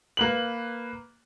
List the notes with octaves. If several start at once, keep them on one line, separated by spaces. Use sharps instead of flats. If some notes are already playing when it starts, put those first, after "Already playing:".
A#3 B4 F#7